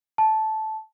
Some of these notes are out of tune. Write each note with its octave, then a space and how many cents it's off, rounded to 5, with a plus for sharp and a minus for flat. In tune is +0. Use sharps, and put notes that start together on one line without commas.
A5 -10